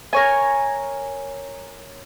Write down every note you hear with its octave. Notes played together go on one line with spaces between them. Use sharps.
A#4 C#5 G#5